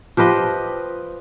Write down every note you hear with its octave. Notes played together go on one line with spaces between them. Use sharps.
F3 G4 B4 D#5